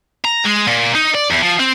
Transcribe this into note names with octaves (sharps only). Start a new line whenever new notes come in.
A#5
G#3
A#2
D#4
D5
E2
F3
C4